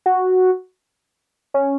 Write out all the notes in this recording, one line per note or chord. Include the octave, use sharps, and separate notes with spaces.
F#4
C#4